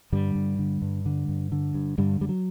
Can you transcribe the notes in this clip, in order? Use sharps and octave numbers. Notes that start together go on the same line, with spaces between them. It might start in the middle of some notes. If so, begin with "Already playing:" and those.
G2 D3 G3
G2
D3
G2
D3
G2
D3
G2
G2 D3 G3
F#2 G3
F#3